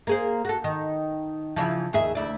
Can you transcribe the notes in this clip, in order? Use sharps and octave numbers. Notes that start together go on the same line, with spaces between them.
A#3 G#4 C5
F#4 A4
D#3
C#3 E3 F3
D#2 G#4 E5
D2 E4 D5